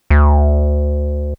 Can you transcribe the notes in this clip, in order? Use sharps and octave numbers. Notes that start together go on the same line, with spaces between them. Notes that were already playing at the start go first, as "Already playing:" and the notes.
D2